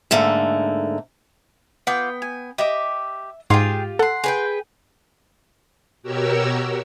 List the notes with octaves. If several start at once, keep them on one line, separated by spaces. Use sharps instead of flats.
G#2 D3 A3 A#3
B3 F4 F#5 G5 D6
G#5
G4 D#5 E5 D6
G#2 F4 G4 G#4 G5 C6
A4 F#5 C6
G#4 B4 G5
B2 F#4 G4 A#4 C#5 E6